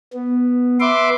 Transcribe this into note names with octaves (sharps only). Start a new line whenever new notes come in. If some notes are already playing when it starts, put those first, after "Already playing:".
B3
B4 E5 C6 D6